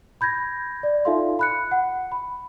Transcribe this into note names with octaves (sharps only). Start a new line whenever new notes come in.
B5 G6 G#6 A#6
D5
D#4 F4 A4 E5 F5 C6
B5 F#6 C#7
F#5
B5